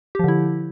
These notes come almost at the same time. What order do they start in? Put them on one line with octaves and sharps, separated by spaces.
G4 F3 D3 E4